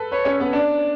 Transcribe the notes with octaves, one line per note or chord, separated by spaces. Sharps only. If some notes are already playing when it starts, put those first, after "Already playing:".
Already playing: A4 B4
B4 C#5
C#4
B3
D4 D5